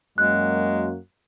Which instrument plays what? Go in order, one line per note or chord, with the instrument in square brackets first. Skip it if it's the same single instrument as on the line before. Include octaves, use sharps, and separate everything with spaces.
[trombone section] F#2 A#3 F#4 [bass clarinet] G#3 [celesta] F#6